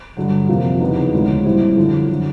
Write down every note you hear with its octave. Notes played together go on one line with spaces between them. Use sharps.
G2 D3 F#3
F2 C3 F3 A#3
E2 C#3 F#3 B3 D#4
D2 C#3 F3 G#3
A#2 G3 C4 E4
F#2 D3 F3
D3 F#3